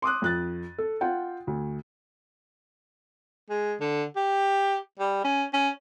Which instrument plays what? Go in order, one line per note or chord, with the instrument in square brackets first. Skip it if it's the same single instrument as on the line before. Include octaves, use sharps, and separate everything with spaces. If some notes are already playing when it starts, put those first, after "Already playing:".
[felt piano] C6 D6 D#6 F#6
F2 F#6 A6
A4
F4 F#5 G5
D2
[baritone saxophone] G#3
D3
G4
G3
C#4
C#4